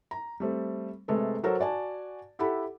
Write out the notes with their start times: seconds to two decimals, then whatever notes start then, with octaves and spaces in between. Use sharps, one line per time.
0.11 A#5
0.40 G3 A3 C4
1.08 C3 G#3 A3 A4 B4
1.43 F#3 F#4 A4 A#4 C5 C#5
1.60 F#4 D5 G#5 A5
2.39 E4 G4 A4 F#5 B5